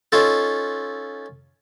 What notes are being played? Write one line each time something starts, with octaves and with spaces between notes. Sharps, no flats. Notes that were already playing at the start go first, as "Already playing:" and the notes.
C#4 D#4 F4 A4